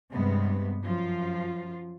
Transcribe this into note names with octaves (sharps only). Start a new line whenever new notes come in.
G2 C3 G#3 B3
F#2 F3 F4